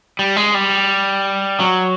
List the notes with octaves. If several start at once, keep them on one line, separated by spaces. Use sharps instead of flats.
G3
G#3
G3
F#3